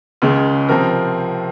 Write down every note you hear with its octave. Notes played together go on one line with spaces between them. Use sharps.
C#2 C#3 G#3
C3 F3 C4 A#4